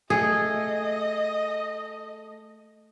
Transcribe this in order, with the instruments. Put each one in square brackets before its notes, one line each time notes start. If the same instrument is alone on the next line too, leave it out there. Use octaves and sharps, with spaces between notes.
[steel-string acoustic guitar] A3 [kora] G#4 [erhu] D#5